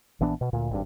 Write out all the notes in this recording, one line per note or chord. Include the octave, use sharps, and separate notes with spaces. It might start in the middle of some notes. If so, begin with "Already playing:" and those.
A#1 E3 B3 D4
B2
D2 A#2
G#1 G2